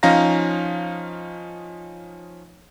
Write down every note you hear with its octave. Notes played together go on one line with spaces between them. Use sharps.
F3 C#4 D#4 F5 A#5 A#6